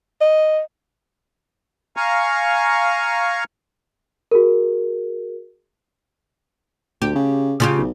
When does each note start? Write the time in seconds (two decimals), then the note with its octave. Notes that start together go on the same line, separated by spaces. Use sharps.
0.21 D#5
1.97 F5 G#5 A#5 C#6
4.31 F#4 G#4 A#4
7.02 D2 G4
7.15 C#3
7.60 C#3 F4 G4
7.78 B1